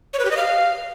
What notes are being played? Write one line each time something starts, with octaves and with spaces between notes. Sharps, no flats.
C#5
B4
G4
D#5
F5